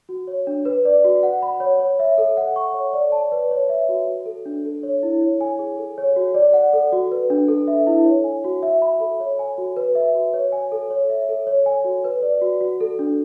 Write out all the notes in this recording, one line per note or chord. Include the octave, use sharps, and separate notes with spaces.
F#4
C#5
D4
B4
D5
F#4
F#5
B5
C#5
C#5
E5
A4
F#5
C#6
C#5
D5
A5
B4
C#5
E5
F#4
F#4
A4
D4
A4
C#5
E4
C#5
G#5
G#4
A4
C#5
F#4
D5
F#5
A4
F#4
B4
D4
A4
E5
E4
C#5
G#5
F#4
E5
B5
A4
C#5
G#5
F#4
B4
E5
F#4
C#5
G#5
A4
C#5
E5
A4
C#5
G#5
F#4
B4
D5
F#4
F#4
A4
D4